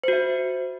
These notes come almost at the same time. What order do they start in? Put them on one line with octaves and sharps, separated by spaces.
C5 F#4 E5